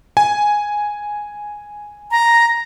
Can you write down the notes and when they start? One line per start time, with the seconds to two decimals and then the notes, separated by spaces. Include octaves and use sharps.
0.17 G#5
2.11 A#5